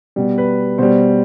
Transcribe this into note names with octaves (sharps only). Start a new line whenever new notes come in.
B2 G3
B4
B2 G3 C5